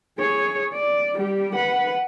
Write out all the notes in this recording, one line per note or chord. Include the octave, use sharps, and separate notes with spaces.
G#4 C#5
D5
G3 G4
B4 F#5